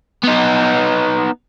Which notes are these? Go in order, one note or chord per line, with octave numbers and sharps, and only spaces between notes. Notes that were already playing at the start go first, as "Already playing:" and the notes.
B3 D#4